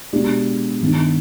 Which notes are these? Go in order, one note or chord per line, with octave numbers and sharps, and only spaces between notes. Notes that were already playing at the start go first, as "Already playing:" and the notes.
B2 G#3 D4 G4 D5
G2 D#3 B3 D4